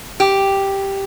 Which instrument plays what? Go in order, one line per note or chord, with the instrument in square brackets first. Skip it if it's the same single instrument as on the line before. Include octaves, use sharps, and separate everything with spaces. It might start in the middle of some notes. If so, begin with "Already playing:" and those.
[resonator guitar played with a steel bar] G4